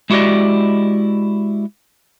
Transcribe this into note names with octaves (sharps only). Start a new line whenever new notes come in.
G#3 E4 F#4 G4 D5 D#5